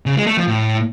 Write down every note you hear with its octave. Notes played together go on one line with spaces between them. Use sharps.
C#3
G#3
A3
F3
A2